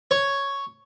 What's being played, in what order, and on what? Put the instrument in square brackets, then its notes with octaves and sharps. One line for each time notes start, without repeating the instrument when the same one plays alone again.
[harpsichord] C#5